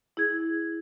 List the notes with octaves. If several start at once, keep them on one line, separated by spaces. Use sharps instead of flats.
E4 G#4 G#6